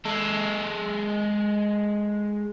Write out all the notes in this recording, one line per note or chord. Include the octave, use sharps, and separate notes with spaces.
G#3 A4